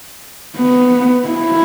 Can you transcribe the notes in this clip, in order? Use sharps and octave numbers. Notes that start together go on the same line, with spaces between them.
B3
E4